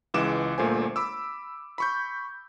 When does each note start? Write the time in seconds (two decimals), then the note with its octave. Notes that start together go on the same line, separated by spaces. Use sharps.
0.14 C#2 E3 G#3 D6 E7
0.58 G1 A#2 A3 C5 G#5
0.96 B5 D6 E6
1.78 B5 C#6 G6